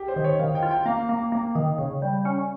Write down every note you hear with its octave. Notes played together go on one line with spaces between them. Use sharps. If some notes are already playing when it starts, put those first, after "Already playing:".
Already playing: G4
C5
D#3
C#5
D#3 F5
G5
F4
G5
A#3 F5
A#3
A#3
D#3
C#3
G3
C#4